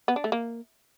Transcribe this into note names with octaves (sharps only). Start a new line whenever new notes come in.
B3
D4
A3
A#3